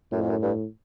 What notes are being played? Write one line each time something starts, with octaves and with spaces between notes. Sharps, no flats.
F#2 A2
F2
F#2
G2